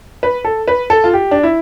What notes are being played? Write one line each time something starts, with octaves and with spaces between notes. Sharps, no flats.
B4
A4
B4
A4
F4
G4
D4
E4